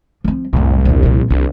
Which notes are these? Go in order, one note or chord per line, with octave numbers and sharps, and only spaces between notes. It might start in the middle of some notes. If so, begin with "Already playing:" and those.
F3 C4
C2 F#2 A2
A#1 E2
A#2 F3
C2 D3